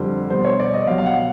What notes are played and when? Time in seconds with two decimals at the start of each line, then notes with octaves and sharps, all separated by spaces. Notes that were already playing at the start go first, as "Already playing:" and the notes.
Already playing: F2 D3 G3 C5
0.30 B2 G3 C5
0.45 C#5
0.60 D5
0.74 D#5
0.87 B2 F5
0.90 F#3
0.98 F5
1.06 F#5